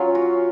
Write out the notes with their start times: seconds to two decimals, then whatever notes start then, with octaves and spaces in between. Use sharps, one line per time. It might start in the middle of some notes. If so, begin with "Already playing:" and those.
Already playing: F#3 C#4 F4
0.15 F#4